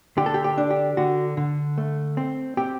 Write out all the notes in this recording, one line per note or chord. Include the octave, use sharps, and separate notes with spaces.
D3 G4
A4
G4
G4
D4
G4
D3 F#4
D3
A3
C4
C4 G4